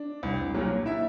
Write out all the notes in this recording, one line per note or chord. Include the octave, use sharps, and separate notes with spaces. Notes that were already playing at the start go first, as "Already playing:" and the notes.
Already playing: D4
C2
A#2 F#3 A#3
E4 E5